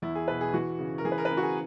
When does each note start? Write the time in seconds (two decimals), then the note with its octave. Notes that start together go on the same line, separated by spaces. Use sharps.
0.02 E2 E4
0.15 G#4
0.28 B2 B4
0.41 G#4
0.54 E3 F#4
0.79 C#3
0.98 A#4
1.05 E3 G#4
1.12 B4
1.18 A#4
1.25 B4
1.30 C#3 A#4
1.37 F#4
1.43 G#4